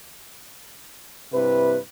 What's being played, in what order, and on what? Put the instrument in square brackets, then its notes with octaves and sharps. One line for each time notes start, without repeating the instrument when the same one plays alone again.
[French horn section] G2 C3 E4 B4